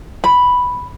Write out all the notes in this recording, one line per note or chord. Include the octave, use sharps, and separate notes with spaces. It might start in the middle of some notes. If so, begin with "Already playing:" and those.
B5